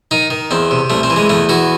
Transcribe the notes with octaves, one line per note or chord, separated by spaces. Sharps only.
D#3 D#4
D#3
E2 C4
C3
C2 A3
C4
E3
G#3
E2 A3
E3 F#4